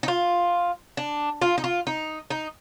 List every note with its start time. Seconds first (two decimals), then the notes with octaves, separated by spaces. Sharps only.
0.03 D#4
0.08 F4
0.97 D4
1.42 F4
1.58 D#4
1.64 F4
1.87 D#4
2.30 D#4